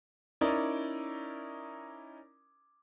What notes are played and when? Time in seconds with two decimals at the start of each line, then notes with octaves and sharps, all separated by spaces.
0.41 C#4 D#4 E4 A#4 D5